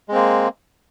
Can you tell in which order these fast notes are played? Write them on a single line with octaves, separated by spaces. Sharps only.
G#3 C4 A#3